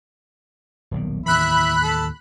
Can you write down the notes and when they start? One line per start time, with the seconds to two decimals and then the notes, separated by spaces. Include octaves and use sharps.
0.91 D#1 B1 D#3
1.26 D#2 A2 E3 E4 B5 F#6
1.83 A4